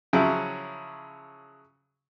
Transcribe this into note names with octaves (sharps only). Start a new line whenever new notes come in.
C#3 F3 F#3 E4